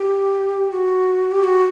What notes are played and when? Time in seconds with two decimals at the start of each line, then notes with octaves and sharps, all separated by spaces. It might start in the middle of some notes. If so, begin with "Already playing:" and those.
Already playing: G4
0.71 F#4
1.31 G4
1.44 F#4